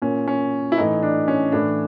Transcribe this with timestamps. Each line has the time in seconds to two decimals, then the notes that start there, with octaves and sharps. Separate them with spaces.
0.02 A#2 C#4
0.28 C#4
0.72 E4
0.78 A2 E3 D#4
1.03 D4
1.28 C#4
1.52 A2 E3 D4